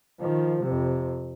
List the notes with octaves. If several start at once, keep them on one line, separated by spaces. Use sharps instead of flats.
D#3 F3
F2 C3